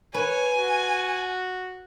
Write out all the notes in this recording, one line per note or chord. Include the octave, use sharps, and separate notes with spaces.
B4 C#5 G#5
F#4